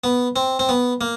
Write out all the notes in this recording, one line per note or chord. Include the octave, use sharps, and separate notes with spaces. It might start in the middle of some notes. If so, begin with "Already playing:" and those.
B3
C4
C4
B3
A#3